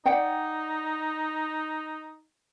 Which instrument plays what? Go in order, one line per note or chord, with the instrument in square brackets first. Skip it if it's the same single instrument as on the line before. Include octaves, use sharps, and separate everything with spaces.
[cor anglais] D#4 [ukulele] D5 F#5 G5